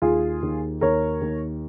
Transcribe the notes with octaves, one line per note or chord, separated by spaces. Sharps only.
D#2 F4 G#4
D#2
D#2 A#4 C#5
D#2